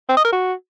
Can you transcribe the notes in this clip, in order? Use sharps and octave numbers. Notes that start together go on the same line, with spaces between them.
C4
D#5
A#4
F#4